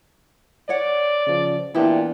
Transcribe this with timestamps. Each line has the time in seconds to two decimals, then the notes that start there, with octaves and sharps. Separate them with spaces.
0.69 C#5 D5 F#5
1.27 C#3 F3
1.75 A#2 E3 B3 D4 E4 G4